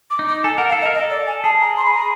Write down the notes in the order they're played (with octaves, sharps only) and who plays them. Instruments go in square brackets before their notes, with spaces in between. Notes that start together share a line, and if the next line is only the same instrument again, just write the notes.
[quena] D6
[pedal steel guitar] D#4
[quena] D6
[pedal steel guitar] A4 [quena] G#5
[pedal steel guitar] A#4 [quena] F#5
[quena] F5
[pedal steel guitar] A4
[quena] D#5
[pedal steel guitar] A#4
[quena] D#5
[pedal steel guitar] A4
[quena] D5
G#5
[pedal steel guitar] G#4 [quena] A5
[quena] A#5
C6
B5
A#5